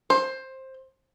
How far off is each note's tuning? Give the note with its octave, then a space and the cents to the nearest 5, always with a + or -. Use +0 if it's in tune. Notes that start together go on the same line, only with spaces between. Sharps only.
C5 +15